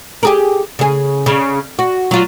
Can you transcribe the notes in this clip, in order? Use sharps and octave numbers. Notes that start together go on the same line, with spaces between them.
G4 G#4 A#4
C#3 G#4
C#3
F#4
F#3 F4